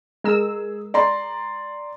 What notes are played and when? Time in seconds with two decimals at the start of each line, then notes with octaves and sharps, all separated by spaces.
0.24 G#3 G#4 A#4 E6
0.94 D5 A#5 C6